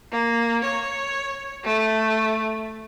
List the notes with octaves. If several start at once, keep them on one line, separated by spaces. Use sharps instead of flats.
A#3
C#5
A3